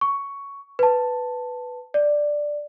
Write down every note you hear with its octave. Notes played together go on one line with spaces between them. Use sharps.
C#6
B4 A5
D5